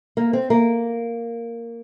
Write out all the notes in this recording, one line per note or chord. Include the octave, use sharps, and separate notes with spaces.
A#3
C4
A#3